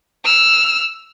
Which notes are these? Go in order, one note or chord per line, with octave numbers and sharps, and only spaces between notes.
E6 F6